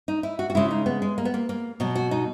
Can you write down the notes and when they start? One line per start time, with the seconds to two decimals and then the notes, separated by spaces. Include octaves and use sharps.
0.08 D#4
0.23 E4
0.39 F#4
0.50 F#4
0.55 C#3 G#3 E4
0.71 D#4
0.86 B3
1.02 G#3
1.18 A#3
1.25 B3
1.34 A#3
1.49 A#3
1.80 B2 F#3
1.96 F#4
2.11 D#4